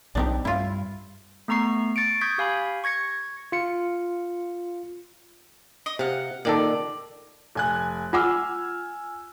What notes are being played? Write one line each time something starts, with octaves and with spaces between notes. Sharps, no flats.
B1 D#3 C4 D4 D#4 G4
G2 E4 F4
A3 B3 A#5 C#6 C7
C#6 A6 C#7 D7
C#6 D#6 G6 G#6 B6
G4 F5 G#5 B5
C#6 G#6 A#6 C#7
F4 C#7
D#5
C3 F5 F#5
A#2 D#3 A4 D5
F1 G#5 F#6
F4 F#5 G#5 D6 E6 F6